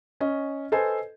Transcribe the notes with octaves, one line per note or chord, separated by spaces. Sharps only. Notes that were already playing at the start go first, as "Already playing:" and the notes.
C#4 D#5
A4 B4 C5 D#5 G#5